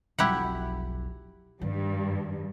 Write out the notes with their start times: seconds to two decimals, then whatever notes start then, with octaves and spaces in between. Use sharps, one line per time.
0.19 F1 B1 E4 G4 F#5
1.61 G2 D#3